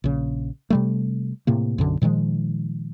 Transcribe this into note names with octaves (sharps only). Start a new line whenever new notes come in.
A#1 C#3
C3 G3 A3
A2 C3 A#3
B1 F#2 D3
A#2 D#3 F3 G#3